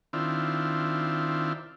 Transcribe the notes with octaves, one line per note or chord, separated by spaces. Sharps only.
D#3 C4 D4 E4 F4